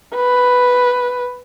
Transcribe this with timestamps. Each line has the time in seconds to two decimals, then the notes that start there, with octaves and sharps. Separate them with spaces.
0.15 B4